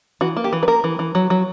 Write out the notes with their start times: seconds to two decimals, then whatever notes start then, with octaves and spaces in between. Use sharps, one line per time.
0.21 E3 F#4
0.37 A#3
0.44 G4
0.53 E3
0.63 B4
0.68 A#3 A#4
0.84 E3
0.99 E3
1.15 F#3
1.30 F#3